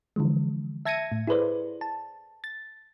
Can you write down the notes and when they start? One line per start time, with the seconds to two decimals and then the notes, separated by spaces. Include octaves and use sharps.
0.16 D3 E3 F3 G#3
0.86 E5 A5 G#6 A#6 C#7 D#7
1.12 A2
1.27 E4 G#4 A4 B4 C5 D5
1.81 A5
2.44 A6